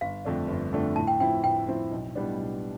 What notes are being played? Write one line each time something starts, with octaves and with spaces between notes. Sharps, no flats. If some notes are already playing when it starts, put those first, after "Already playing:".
G1 F5
F2 D3 A3 D4
G1
F2 D3 A3 D4
A2 A5
G5
F3 C4 E4 G5
A2 G5
F3 C4 E4
B1
A2 G3 B3 D4
B1